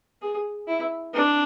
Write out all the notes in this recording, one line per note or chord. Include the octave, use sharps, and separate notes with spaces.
G#4
E4
D4